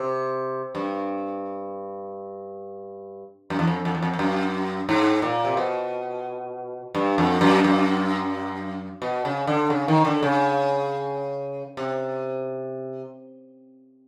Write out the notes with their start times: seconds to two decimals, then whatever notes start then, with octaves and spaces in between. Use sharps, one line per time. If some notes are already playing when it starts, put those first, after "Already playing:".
Already playing: C3
0.75 G2
3.50 F#2
3.59 E2
3.67 F2
3.85 F2
3.95 E2
4.02 F2
4.13 F2
4.19 F#2
4.89 G#2
5.22 A#2
5.45 C3
5.57 B2
6.95 G2
7.18 F2
7.41 F#2
7.64 F#2
9.02 B2
9.25 C#3
9.47 D3
9.70 C#3
9.88 D#3
10.05 D3
10.23 C#3
11.77 C3